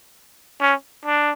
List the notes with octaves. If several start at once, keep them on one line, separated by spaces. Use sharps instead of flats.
C#4
D4